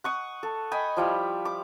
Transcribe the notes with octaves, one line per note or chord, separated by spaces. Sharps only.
F#5 C#6 D#6
A4
D#5 G5 G#5 B5
F3 G3 E4
D6